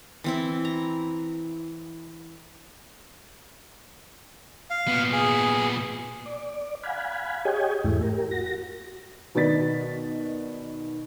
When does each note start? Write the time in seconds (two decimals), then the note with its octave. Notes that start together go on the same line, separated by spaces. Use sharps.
0.24 E3 C4 E4
0.65 A#5
4.70 F5
4.88 A#2 B3
5.13 G#4
6.26 D5
6.83 F5 F#5 G#5 B5
7.45 G4 G#4 C#5 D#5 G5 G#5
7.84 E2 G#2 A3 E4
8.03 G4 A#4
8.31 F#4 A#6
9.35 B2 D#3 B3 D5 A6 B6